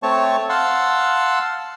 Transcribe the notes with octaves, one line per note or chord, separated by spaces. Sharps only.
A3 C4 C#5 A5 C#6
F5 F#5 A5 C6 E6